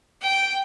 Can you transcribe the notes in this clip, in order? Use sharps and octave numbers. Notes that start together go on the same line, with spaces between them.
G5